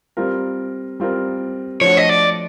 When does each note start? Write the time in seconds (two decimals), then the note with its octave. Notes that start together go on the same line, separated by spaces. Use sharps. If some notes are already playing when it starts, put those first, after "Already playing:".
0.17 G3 C4 F4 A#4
1.00 G3 C4 F4 A#4
1.81 F3 A3 D4 F#4 C#5
1.97 D#5
2.09 D5